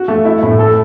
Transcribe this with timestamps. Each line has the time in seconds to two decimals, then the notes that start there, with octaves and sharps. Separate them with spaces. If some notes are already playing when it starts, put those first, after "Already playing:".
Already playing: F#4
0.08 A3
0.25 E4
0.43 A2
0.59 A4